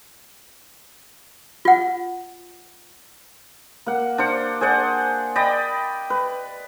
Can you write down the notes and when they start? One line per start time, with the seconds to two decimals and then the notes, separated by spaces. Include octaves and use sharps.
1.65 F4 F#5
3.86 A#3 F#5
4.18 D4 C5 F#5
4.61 G#4 C5 D5 F#5
5.36 D5 D#5 G5 B5
6.10 B4